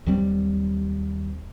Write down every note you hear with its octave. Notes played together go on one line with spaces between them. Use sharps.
D#2 F#3 G3 C4